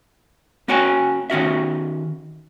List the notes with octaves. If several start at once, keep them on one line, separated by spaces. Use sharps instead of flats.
A#3 C#4 F#4 C#5 G5 G#5
D#3 C#4 F#4 E5